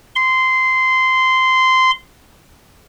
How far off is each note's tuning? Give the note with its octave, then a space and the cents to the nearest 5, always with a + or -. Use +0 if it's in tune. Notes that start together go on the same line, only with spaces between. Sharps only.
C6 -15